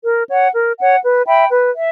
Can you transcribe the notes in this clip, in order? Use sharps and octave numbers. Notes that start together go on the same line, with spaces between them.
A#4
C#5 F#5
A#4
C#5 F#5
B4
E5 G5 B5
B4
E5